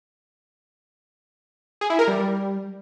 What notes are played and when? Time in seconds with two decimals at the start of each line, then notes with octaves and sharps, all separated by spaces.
1.81 G#4
1.90 E4
1.99 A#4
2.08 G3